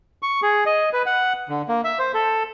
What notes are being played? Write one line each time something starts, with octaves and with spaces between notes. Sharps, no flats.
C#6
G#4
D#5
B4
F#5
D3
A#3
E5
C5
A4